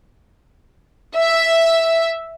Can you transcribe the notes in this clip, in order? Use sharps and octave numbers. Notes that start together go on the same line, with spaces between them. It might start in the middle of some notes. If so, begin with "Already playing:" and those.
E5